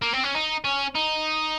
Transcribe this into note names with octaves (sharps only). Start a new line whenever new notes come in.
A#3
C4
C#4
D#4
C#4
D#4